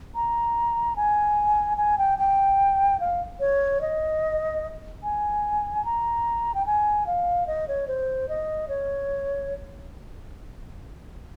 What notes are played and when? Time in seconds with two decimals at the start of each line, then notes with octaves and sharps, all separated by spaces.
0.15 A#5
0.96 G#5
1.78 G#5
1.98 G5
2.19 G5
3.00 F5
3.40 C#5
3.81 D#5
5.03 G#5
5.85 A#5
6.54 G5
6.66 G#5
7.07 F5
7.47 D#5
7.68 C#5
7.88 C5
8.29 D#5
8.69 C#5